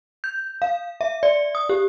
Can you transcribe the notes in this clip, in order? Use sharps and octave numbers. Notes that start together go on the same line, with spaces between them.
G6
F5
E5
D5
D#6
G4